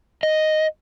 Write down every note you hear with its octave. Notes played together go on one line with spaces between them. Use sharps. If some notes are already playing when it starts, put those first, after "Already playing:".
D#5